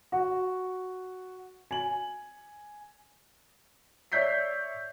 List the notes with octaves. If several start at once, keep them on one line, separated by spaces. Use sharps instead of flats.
F#4
G#5 F#7
C#5 D5 E5 G6 B6 C7